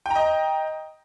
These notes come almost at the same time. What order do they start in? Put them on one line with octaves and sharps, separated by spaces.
G5 A#5 D#5